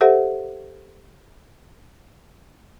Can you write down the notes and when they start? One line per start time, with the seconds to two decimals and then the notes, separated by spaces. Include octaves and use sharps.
0.01 G4 A4 C5 E5 F#5